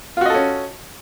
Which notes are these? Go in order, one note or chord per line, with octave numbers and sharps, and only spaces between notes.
C#4 F4 F#4 A4 D#5